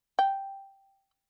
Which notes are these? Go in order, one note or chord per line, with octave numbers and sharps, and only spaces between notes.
G5